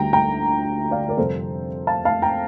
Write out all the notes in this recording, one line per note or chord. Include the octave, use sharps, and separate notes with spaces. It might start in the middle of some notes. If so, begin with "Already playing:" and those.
Already playing: D2 D3 G3 G5 A#5
G5 A#5
D5 F5
A#4 D5
F2 C3 G3 A4 C5
F5 A5
F5 A5
G5 A#5